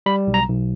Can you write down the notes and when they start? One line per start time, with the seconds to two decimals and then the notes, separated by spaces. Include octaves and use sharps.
0.06 G3 B5
0.27 B1
0.34 A#5
0.48 B1